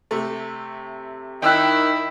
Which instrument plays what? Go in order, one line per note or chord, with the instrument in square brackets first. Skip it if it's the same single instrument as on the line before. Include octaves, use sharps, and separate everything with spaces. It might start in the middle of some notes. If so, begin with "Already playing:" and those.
[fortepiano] C3 A3
[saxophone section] D#3 [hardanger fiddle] E4 [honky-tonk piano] G5 E6 F#6